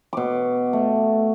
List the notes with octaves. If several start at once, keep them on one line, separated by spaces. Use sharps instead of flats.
B2 D6
A3